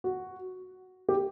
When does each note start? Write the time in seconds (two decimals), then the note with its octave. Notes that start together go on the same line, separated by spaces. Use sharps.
0.04 F#4
1.09 G4